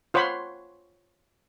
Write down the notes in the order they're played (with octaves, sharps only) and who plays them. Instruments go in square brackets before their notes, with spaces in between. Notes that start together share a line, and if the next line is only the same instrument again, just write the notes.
[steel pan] F4 C5 C#5 F#5 B5 C6